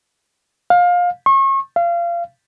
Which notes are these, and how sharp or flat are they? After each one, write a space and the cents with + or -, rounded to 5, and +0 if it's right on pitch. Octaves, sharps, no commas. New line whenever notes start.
F5 +25
C#6 -35
F5 -25